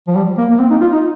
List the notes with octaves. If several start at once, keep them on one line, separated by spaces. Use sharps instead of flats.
F3
G3
A#3
A#3
C4
D#4
F4
D#4